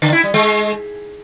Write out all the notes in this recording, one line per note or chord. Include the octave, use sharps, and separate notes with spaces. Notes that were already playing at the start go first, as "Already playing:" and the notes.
D3
E4
G3
G#3